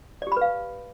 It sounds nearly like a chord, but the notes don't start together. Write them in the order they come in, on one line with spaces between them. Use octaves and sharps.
D5 G4 B5 B4 F5